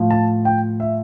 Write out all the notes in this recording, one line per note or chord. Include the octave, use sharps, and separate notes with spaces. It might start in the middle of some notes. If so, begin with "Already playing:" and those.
Already playing: A2 F3
A5
G5
E5